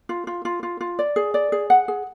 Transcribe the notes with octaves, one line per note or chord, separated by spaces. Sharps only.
F4
F4
F4
F4
F4
D5
G#4
D5
G#4
F#5
G#4